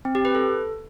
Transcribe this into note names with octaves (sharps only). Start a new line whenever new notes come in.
C4
G4
B4
A4